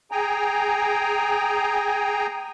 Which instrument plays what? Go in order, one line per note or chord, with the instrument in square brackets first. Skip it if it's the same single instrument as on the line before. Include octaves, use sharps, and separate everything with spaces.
[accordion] G#4 G5 G#5 A#5